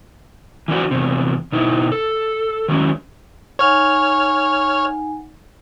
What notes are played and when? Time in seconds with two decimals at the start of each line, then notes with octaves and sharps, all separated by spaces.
0.68 E3 F3 D4 F#4
0.91 E2 C3
1.52 B2 D#4 E4
1.92 A4
2.68 D#3 F#3 G#3 C#4
3.59 D#4 C#5 F#5 G#5 F6